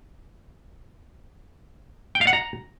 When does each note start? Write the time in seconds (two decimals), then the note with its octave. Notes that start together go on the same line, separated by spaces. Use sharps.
2.15 G5
2.21 F5
2.27 F#5
2.33 A#5